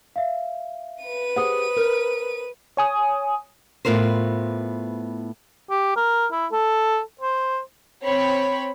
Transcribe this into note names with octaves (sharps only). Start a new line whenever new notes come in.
E5 F5
B4 D#7
G4 G#4 C5 F#5 D#6
A#4
C#5 G#5 D#6
A2 B3 F4 A#4 C5
G4
A#4
E4
A4
C5
C4 C#5 B5